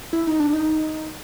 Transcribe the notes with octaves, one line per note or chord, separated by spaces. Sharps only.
E4
D#4
D4
D#4